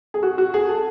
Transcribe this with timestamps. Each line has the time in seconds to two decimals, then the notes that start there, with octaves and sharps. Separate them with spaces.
0.14 G#4
0.23 F#4
0.38 F#4
0.54 G#4
0.69 A4